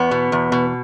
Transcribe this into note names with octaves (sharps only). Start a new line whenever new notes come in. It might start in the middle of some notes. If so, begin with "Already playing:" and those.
Already playing: E2 B3
B2
E2
B2